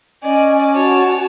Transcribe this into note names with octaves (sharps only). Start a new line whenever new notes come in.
C#4 D5 D#5 G#5
F#4 C#5 A5